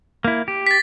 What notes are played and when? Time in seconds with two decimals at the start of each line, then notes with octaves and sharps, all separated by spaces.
0.24 A#3 E4
0.48 G4
0.67 A6 B6